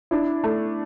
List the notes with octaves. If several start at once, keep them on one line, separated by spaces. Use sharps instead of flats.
D4 E4
A3